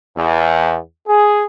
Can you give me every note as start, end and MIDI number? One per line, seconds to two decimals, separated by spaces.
0.17 0.78 40
1.07 1.44 68